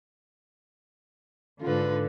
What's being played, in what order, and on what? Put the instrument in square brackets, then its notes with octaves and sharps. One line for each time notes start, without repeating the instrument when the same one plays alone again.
[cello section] G#2 D3 [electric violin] F4 B4